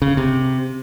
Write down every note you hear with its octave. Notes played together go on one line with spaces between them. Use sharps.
C#3
C3